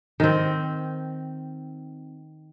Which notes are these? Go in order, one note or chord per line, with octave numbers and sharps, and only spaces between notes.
D#3 C4